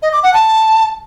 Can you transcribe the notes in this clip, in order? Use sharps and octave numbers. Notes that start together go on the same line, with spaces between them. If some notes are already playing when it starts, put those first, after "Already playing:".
D#5
D6
F#5
A5